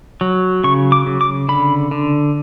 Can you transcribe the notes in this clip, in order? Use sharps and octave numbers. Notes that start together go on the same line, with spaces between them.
F#3
C#3 C#6
D6
C#3
D6
D3 B5
D3